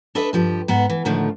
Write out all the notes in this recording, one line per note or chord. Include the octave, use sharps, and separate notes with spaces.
D4 A4 B4 D#5 E5
G2 F3 G4
G#2 B3 F#5
E3
A2 D3 D#3 F3 A3